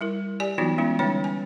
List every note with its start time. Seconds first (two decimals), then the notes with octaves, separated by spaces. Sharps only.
0.01 G3 E4 A#4
0.40 G4 D5 G#5
0.58 E3 F#3 B3 D#4 F4 F#4
0.78 G#3 B3 C#4 E4
0.99 D3 G3 C#4 D#4 C#5 G5
1.24 G#5